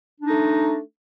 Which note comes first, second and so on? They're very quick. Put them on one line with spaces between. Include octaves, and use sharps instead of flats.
D4 D#4 A3